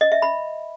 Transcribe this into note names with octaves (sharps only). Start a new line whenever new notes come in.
D#5
E5
B5